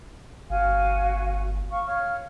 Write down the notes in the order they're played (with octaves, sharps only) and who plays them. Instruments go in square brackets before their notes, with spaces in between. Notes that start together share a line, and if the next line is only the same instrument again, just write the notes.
[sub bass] G1 [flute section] F#4 F5 G#5
[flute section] F5 C#6
C#5 F5 F6